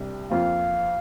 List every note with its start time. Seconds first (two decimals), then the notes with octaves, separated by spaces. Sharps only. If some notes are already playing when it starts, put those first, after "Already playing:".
Already playing: C2 C3 G3 D4 G4
0.30 F2 F3 A#3 F4 F5